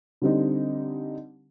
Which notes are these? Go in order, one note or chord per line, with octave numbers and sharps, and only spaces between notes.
D3 G3 C4 D#4